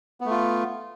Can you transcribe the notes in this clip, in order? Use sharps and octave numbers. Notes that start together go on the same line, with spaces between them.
A3 B3 F4